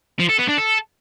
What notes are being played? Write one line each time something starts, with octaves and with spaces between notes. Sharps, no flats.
F3
A4
B3
D4
A4